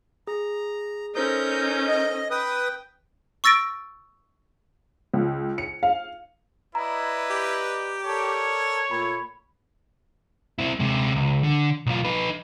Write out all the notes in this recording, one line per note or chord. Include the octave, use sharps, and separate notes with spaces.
G#4 A#5
C#4 D#4 A4 A#4 C5 D#6 G6
D#5
B4 G5 D#6
C#6 E6 A6 A#6 D7
C#2
C#7
F5
E4 B4 D5 D#5 A#5
G4
A4 A#4 C#5 D5
A#2 A3 B5
C4 E4
C3 G#3
C#2
D3
B1 F4
D#4 B4